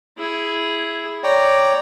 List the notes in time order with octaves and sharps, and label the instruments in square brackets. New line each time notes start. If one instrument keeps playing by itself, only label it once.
[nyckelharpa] E4 G#4
[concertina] C#5 D5 G5 [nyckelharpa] A#5